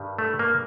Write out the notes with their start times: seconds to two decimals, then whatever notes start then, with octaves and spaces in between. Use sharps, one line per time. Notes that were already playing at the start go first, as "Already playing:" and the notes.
Already playing: G2 D#3 G3
0.18 A3
0.39 A#3